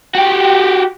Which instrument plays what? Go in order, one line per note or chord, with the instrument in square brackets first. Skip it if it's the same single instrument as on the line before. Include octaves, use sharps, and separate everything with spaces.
[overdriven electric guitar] F#4 G4